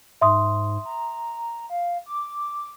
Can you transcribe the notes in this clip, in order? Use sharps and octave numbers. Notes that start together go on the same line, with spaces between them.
G#2 E5 C6 D#6
A#5
F5
D6